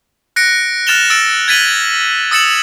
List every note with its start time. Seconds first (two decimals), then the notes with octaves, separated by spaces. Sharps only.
0.36 F#6 A#6 C#7 D7
0.87 F6 F#6 A6 E7 F7 G7
1.10 E6 A6 D7
1.48 G#6 A6 B6 D#7 F#7 G7
2.31 D#6 E6 A6 C#7 E7 F#7